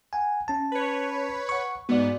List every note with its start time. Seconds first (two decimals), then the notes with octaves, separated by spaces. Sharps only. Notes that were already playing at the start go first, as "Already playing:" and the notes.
0.13 F#5 G#5
0.48 C#4 A5
0.72 B4 C#5
1.49 F#5 C#6
1.89 G#2 B3 F#4 D5